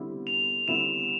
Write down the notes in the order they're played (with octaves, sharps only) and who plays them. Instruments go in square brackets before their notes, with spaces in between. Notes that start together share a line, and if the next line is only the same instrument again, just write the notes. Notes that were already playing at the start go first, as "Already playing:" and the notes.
Already playing: [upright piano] D3 G3 C4 E4
[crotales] F7
[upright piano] D3 G3 C4 E4 [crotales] E7